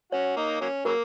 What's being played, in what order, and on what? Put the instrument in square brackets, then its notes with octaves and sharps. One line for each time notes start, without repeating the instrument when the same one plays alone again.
[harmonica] C#4 F#4 [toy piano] C#5
[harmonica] A#3 D#4
F#3 A#3 C#4
[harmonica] C#3 F#3 A#3 [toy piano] A#4